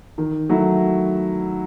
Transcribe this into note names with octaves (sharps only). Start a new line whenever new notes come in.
D#3
F#3 A3 E4